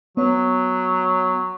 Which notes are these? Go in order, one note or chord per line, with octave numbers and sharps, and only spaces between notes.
F#3 B3 C#5